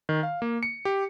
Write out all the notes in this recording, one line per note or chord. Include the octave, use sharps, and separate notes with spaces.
D#3
F5
A#3
C#7
G4